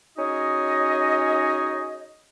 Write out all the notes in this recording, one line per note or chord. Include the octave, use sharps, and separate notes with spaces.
C#4 D#4 F#4 G#4 D#5